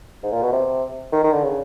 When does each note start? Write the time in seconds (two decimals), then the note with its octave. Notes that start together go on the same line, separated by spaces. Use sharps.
0.23 G#2
0.32 A#2
0.42 B2
0.53 C3
1.12 D#3
1.24 D#3
1.33 D3
1.44 C#3